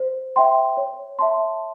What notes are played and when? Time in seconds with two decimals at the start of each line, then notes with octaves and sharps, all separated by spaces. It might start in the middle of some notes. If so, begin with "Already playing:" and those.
Already playing: C5
0.36 E5 G5 C6
0.77 C#5
1.19 E5 A5 C6